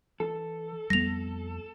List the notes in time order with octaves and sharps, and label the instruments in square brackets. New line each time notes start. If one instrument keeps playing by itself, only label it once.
[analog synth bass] E3 [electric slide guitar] A4
[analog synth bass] F2 [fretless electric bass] G3 B3 [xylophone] A#6 F7